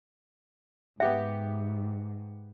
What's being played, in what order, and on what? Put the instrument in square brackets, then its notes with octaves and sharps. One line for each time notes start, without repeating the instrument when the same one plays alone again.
[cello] G#2 [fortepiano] B3 G4 F#5 [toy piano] E5